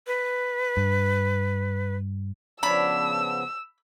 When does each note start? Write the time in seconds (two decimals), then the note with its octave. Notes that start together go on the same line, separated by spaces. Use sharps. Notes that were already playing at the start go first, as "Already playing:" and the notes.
0.07 B4
0.77 G2
2.63 C#3 F3 B3 D4 C#5 B5 E6